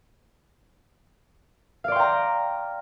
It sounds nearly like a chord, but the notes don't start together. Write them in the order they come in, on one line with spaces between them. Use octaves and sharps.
F5 D5 C6 G5 A#5